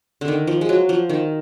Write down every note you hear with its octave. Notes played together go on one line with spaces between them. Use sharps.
D3
D#3
F3
G#3
F#3
F3
D#3